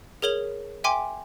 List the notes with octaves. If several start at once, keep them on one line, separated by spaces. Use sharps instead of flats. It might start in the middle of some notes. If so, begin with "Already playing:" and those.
G#4 A#4 C#5 F#7 G7
E5 G5 G#5 C6 D6